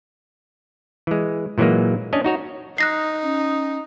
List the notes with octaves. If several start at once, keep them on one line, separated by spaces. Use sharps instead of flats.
E3 G#3
A#2 E3 F#3 G#3 A#3
C#4 D4 D#5
D#4 F#4 C#5
D#4 F#6 A#6 C7
C#4